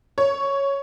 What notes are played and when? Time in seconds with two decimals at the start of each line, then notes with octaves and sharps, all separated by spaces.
0.18 C#5